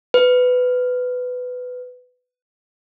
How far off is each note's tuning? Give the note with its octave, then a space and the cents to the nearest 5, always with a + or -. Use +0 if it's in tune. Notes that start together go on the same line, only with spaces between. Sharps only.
B4 +15